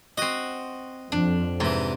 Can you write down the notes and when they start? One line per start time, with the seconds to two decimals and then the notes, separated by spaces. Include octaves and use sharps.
0.17 C4 F#4 D#5
1.12 F2 D4
1.60 G#2 C3 E3